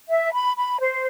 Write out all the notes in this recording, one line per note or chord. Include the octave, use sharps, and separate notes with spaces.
E5
B5
B5
C5